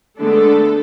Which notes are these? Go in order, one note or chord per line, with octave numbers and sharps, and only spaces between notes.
D3 G#3 A3 B3 D4 A4